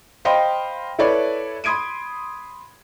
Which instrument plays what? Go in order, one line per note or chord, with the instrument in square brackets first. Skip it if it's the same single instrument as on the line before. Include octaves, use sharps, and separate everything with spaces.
[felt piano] C5 D#5 F5 G5 B5 C6
E4 A4 B4 C#5 D5
B5 C6 D#6 G#6 D7 D#7